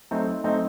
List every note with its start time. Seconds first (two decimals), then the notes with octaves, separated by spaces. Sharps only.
0.11 F#3 A3 C4 D#4
0.44 F#3 A3 C4 D#4